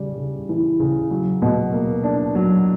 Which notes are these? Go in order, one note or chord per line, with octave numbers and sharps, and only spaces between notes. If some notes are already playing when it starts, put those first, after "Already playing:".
Already playing: C#3 G3
C#3
E3
C#3
F#3
B2
A#3
D4
F#3